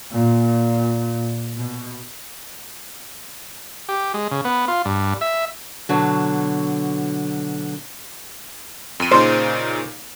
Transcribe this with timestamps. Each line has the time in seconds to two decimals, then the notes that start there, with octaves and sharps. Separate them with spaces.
0.12 A#2
1.57 B2
3.89 G4
4.14 G#3
4.31 C#3
4.45 B3
4.68 F4
4.85 G2
5.21 E5
5.89 B2 D3 F#3
9.00 F2 D#7
9.11 A#2 C#3 D#4 C5